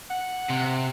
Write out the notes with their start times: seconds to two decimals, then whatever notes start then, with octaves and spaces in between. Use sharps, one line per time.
0.10 F#5
0.49 C3